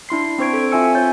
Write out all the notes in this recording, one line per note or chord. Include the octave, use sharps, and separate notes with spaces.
D4 E4 C6 C7
C4 D4 C5 C#6 G#6 D7
A4
C4 F4 E5 G#5 E6 C#7
C#5 G#5 G6 A6